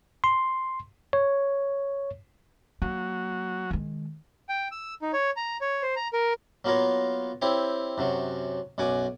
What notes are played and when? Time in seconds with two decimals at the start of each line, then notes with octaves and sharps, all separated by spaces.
0.24 C6
1.13 C#5
2.82 F#3 A#3 F#4
3.71 D#3 G#3
4.49 G5
4.72 E6
5.02 D#4
5.13 C#5
5.36 A#5
5.61 C#5
5.82 C5
5.96 A#5
6.13 A#4
6.65 F#3 A#3 B3 F4 A#4 C#5
7.42 C4 E4 G4 C#5
7.98 F#2 C3 F#3
8.78 B1 F#2 F#5 G#5 D6